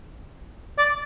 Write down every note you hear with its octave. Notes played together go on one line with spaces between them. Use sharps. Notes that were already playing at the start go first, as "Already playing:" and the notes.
D5